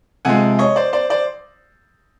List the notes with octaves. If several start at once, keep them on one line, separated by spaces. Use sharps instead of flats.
C3 F3 G#3 F#5 G#5
C#5 D#5
C5 D5
C5 D5
C5 D5